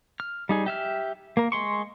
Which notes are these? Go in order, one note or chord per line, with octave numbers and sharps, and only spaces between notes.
F6
G3 D#4 G#4
G4 E5 F6
A#3 A#4
G#3 C6 C#6